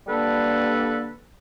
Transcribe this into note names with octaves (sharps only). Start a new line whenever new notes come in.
D3 G3 A#3 D4 A4 B4